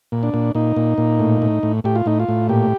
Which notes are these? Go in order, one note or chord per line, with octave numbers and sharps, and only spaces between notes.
A#2
D4
A#2
A#2 D#4
A#2
A#2
A2
A2
A2
A2 G4
F4
A2 D#4
F4
A2
A#2 G4